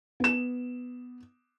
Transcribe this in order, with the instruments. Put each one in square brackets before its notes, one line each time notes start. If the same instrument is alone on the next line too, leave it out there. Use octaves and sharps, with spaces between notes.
[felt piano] B3 E7